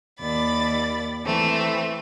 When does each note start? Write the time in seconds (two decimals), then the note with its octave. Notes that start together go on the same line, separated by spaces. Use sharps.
0.20 D#2 D5 B5 A6
1.25 E3 A3 C4